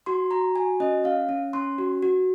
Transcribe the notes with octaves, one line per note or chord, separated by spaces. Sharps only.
F#4 C6
F#4 A#5
F#4 G#5
C#4 D#5
C#4 F5
C#4
C#4 C6
F#4
F#4